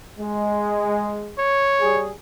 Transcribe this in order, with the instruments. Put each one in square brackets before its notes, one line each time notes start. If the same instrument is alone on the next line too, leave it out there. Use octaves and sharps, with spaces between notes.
[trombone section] G#3
[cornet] C#5
[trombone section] G3 G#4